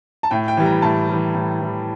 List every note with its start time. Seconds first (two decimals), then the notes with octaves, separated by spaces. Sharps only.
0.23 A5
0.31 A2 G5
0.48 G5
0.57 E3 G3
0.65 A#5
0.82 A2 A5
1.09 E3 G3
1.35 A2
1.61 E3 G3